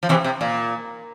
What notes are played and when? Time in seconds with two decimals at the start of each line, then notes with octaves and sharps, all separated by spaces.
0.03 F3
0.09 C3 E3
0.24 C3
0.41 A#2